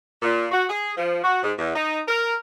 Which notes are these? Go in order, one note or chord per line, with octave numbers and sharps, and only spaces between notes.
A#2
F#4
G#4
F3
F#4
G#2
E2
D#4
A#4